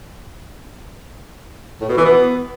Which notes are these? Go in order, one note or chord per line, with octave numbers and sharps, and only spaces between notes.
A2
B2
E3
B3